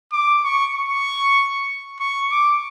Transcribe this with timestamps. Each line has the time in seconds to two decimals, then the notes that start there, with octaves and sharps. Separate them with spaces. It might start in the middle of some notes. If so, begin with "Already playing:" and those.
0.12 D6
0.44 C#6
0.75 C#6
1.99 C#6
2.31 D6